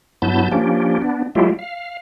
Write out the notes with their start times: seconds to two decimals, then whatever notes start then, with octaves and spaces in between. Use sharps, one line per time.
0.22 G2 F#3 B3 E4 A5 G6
0.52 F3 A#3 C#4 D4 G4
1.02 B3 D4
1.35 F#3 G#3 A3 E4 F4 G4
1.59 F5